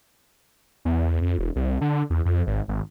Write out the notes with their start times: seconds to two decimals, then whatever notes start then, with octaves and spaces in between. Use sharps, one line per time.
0.85 E2
1.21 F2
1.39 E1
1.56 C2
1.81 D3
2.10 E2
2.25 F2
2.47 G#1
2.68 G#1